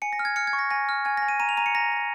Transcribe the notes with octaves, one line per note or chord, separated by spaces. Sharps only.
G#5 C#7
A#6
F6
G#6
F6 C#7
G#6
C#6
A#6
G#5 A#6
F6
G#5 G#6
A#6
G#5
D#7
A#5 D#7
F7
A#5 D#7
C#7
A#5 A#6
A#5